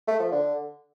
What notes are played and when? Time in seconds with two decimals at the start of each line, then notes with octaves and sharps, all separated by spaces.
0.08 A3
0.20 F3
0.32 D3